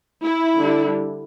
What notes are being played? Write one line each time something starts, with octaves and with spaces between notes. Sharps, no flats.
E4
D3 G3 D4